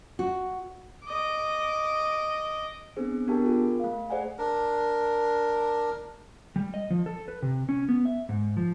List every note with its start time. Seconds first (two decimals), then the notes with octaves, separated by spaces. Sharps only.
0.19 F#4
1.05 D#5 D6
2.96 B3 C4 D4 G#4 C5
3.28 B3 D4 G4 A#4 G5 A5
3.44 F4 G#4 A#4
3.80 A3 F5
4.10 G#4 C5 D5 F#5 G#5
4.38 D4 A#4
6.56 G3
6.74 D#5
6.90 F3
7.06 A4
7.28 B4
7.42 C3
7.69 C#4
7.89 B3
8.05 E5
8.29 G#2
8.57 F3